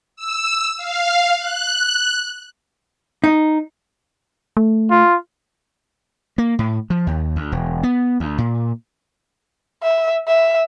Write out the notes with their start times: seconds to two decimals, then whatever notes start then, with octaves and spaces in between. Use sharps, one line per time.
0.16 E6
0.77 F5
1.39 F#6
3.24 D#4
4.57 A3
4.91 F4
6.38 A#3
6.59 A2
6.90 F3
7.07 D#2
7.36 D2
7.52 E1
7.83 B3
8.20 D2
8.38 A#2
9.83 E5
10.27 E5